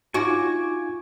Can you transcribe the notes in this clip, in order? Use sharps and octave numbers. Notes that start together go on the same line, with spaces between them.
D#4 F4 F#4 G#5 C#6 D6